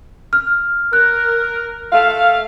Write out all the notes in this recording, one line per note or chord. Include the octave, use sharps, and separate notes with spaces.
F6
A#4 F#6
A3 F5